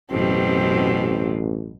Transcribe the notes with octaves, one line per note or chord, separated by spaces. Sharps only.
A1 F#2 B2 C4 G4